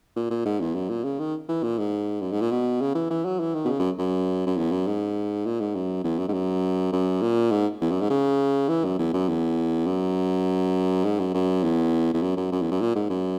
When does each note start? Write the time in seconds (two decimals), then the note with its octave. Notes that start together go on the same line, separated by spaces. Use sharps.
0.16 A#2
0.31 A#2
0.45 G#2
0.60 E2
0.75 F#2
0.90 A#2
1.04 C#3
1.19 D#3
1.48 E3
1.63 A#2
1.78 G#2
2.21 F#2
2.32 G#2
2.41 A#2
2.51 B2
2.81 C#3
2.95 E3
3.10 E3
3.25 F#3
3.40 E3
3.54 D#3
3.65 B2
3.68 C#3
3.79 F#2
3.98 F#2
4.47 F#2
4.57 E2
4.72 F#2
4.87 G#2
5.46 A#2
5.60 G#2
5.75 F#2
6.04 E2
6.19 F#2
6.28 G#2
6.33 F#2
6.93 F#2
7.22 A#2
7.51 G#2
7.81 E2
7.91 F#2
8.01 G#2
8.10 C#3
8.69 E3
8.84 F#2
8.99 E2
9.13 F#2
9.29 E2
9.87 F#2
11.05 G#2
11.20 F#2
11.35 F#2
11.63 E2
12.14 E2
12.22 F#2
12.37 F#2
12.52 F#2
12.62 E2
12.72 F#2
12.81 A#2
12.96 G#2
13.10 F#2